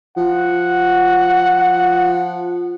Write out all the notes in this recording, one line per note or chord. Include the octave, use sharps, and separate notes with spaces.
F3 F#5